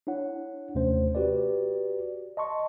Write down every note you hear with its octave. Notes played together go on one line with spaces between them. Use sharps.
D4 E4 C#5 F#5
D#2 C3 A3 C#4 C5
F#4 G4 B4 D5
D#5 A5 C6 C#6